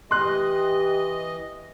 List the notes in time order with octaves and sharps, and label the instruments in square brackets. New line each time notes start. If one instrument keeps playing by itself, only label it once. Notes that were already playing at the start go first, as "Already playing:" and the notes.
[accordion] E3 D#5 [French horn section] G4 [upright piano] C6 F#6